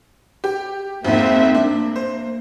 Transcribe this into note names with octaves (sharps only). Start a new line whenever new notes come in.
G4
G#1 F2 G#2 A#3 C4 E5
A#3 D4
C5